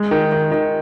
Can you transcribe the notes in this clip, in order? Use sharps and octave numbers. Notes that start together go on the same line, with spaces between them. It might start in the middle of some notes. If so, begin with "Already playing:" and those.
Already playing: G#3
D#3
D#3
D#3